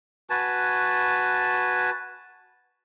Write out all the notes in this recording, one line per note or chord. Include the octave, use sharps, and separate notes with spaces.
F#4 B4 G#5 A5